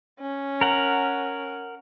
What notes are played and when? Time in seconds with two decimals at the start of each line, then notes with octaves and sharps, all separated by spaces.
0.20 C#4
0.61 A#4 F#5